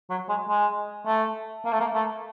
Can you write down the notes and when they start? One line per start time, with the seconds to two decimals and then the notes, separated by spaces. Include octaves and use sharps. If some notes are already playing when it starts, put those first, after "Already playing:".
0.10 F#3
0.29 G#3
0.49 G#3
1.07 A3
1.65 A#3
1.72 A3
1.80 A#3
1.94 A3